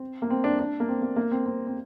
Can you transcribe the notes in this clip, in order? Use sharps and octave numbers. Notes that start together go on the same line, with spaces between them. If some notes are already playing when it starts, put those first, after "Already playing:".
Already playing: C4
A#3
C4
D4
D4
A#3
C4
A#3
A#3
C4
C4
C4